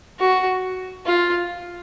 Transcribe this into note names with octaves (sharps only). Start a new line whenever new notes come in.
F#4
F4